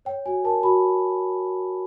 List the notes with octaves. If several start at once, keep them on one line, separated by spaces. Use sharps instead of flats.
C#5 G5
F#4 G#5
A#4 A5
F#4 B5